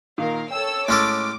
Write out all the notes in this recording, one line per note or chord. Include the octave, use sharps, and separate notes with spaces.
A#2 D#3 A#4 F5
A4 C#5 G5 E6
A2 G#3 C#4 A4 D6